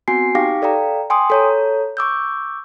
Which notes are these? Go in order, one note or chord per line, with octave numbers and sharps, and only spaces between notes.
B3 C4 F#4 G#5 C7
D#4 G4 F5 G5 D6 A#6
A4 D5 F5 G5 A#5
G5 G#5 C6 D6 D#6
A4 C#5 A#5
C#6 D6 E6 G6